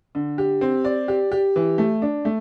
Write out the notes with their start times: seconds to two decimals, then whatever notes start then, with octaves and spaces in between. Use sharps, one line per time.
0.15 D3
0.38 G4
0.61 C4
0.84 D5
1.08 G4
1.31 G4
1.56 E3
1.78 A3
2.02 D4
2.25 A3